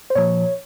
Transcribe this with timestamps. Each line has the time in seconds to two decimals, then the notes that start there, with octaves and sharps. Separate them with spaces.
0.10 C5
0.15 A#2 F3 C#5